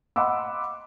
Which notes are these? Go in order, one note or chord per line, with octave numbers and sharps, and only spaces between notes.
D#5 F#5 B5 C6 D6 E6